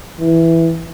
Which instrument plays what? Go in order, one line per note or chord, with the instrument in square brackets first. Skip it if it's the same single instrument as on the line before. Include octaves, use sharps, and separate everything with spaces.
[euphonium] E3